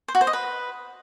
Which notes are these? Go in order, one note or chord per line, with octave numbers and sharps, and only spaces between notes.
C5
F#4
C5
D#5
B4